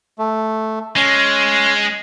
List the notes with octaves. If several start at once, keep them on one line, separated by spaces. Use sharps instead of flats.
A3
G#3 C#4